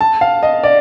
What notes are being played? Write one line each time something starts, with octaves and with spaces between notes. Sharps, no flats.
A5
F5
D#5
D5